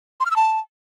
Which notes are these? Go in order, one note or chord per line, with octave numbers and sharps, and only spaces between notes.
C6
F6
E6
A5